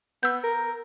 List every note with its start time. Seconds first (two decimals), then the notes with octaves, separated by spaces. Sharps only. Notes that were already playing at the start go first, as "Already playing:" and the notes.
0.23 B3 E6 G6
0.44 A#4